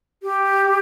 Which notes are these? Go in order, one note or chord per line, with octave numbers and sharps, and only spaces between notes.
G4